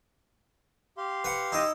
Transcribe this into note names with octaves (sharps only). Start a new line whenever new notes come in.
G4 F5 C6
B4 F#5
D#4 E4 D#5